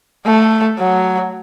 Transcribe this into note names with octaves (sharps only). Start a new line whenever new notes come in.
A3
F#3